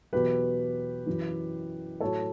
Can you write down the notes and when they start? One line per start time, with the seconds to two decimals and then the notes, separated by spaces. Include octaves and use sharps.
0.13 E2 B2 F#3 G4 B4
1.06 F#2 E3
2.00 A2 F#3 A4 C#5